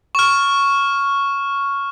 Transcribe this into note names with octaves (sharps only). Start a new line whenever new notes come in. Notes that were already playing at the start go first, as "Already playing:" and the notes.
C#6 F6